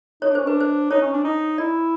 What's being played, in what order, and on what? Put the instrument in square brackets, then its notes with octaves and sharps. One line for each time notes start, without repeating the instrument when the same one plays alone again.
[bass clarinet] D#4 [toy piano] C#5
[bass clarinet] D4
[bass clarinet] C#4 [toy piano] C5
[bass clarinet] D4 [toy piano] B4
[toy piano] C5
[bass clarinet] D#4 [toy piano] C#5
[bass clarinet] C#4
D4
D#4
[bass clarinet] E4 [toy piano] D5